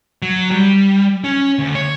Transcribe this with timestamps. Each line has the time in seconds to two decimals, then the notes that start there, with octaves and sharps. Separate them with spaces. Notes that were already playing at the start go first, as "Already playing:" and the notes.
0.22 F#3
0.51 G3
1.24 C#4
1.59 D2
1.75 C#5